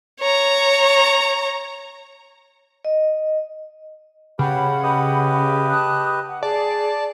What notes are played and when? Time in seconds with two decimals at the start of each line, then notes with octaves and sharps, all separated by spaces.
0.21 C#5 A#5
2.85 D#5
4.39 C#3 G4 B4 F#5 B5
4.83 G4 B4 D#5
5.70 A5 D#6 F#6
6.25 F#5
6.43 G#4 D5 A5